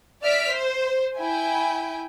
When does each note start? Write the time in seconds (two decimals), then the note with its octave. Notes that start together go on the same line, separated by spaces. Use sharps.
0.23 D5 E5 F6 B6 D7
0.52 C5
1.19 E4 G5 G#5